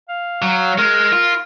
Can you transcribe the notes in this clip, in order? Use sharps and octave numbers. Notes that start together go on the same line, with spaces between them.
F5
F#3
G#3 A#4
F4